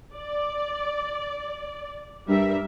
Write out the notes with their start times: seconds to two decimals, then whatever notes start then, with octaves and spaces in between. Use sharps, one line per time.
0.14 D5
2.29 G2 G3 A#4 E5